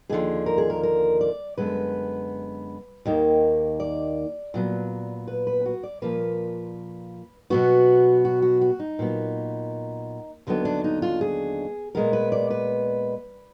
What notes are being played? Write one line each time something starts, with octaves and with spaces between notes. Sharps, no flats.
D#2 D3 F3 G#4
A#4
G#4
A#4
A#4
D5
F#2 D3 G#3 B3 B4
D#2 D#3 A#3
D5
A#2 F#3 B3
B4
B4
F#4
D5
A#2 F3 A#3 B4
B2 F#3 B3 F#4
F#4
F#4
F#4
D#4
A#2 F#3 B3
D#2 D3 F#3 B3
D4
D#4
F4
G#4
A#2 G#3 B3 A#4
B4
D5
B4